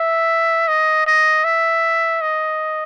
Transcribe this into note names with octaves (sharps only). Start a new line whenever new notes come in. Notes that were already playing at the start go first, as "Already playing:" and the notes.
Already playing: E5
D#5
D#5
E5
D#5